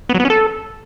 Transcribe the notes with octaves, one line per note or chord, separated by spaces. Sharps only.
B3
F#3
B3
C#4
A4